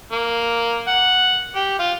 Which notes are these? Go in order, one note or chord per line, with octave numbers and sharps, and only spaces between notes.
A#3
F#5
G4
F4